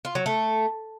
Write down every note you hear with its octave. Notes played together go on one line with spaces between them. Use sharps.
F4
F#3
A3